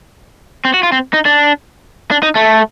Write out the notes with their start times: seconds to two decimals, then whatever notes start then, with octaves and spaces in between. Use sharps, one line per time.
0.65 C4
0.74 F#4
0.83 F4
0.92 C4
1.13 D#4
1.26 D4
2.11 D4
2.23 D#4
2.35 A3